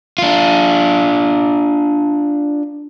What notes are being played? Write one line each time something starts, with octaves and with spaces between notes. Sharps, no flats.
D4 F4